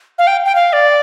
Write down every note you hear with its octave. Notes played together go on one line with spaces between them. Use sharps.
F5
G5
G5
F5
D5